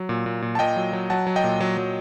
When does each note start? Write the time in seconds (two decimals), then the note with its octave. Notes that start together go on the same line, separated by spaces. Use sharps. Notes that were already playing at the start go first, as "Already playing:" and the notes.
Already playing: F#3
0.09 A#2
0.26 A#2
0.42 A#2
0.55 A5
0.59 A#2 D#5 G5
0.76 F#3
0.93 F#3
1.10 F#3 F#5 A5
1.27 F#3
1.36 D#5 G5
1.44 A#2
1.61 F#3
1.78 F#3